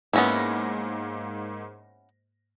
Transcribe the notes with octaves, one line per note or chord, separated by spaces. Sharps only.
G#2 A#3 B3 C#4 E4 A#6